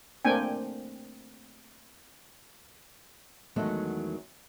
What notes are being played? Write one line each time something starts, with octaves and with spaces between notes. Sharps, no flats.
A3 A#3 C4 D4 G5 G#5
E2 D#3 F#3 G#3 A3